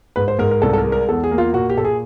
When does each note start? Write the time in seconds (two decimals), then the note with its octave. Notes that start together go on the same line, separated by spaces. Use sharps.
0.16 G#2 B4
0.28 C5
0.39 G#2 A#4
0.51 A#4
0.62 C2 A4
0.73 A4
0.78 A#4
0.85 G#3
0.92 A#4
1.08 E2 A4
1.24 G#4
1.31 A#3
1.38 F4
1.54 A#2 F#4
1.70 G4
1.77 A#2 A4
1.85 G#4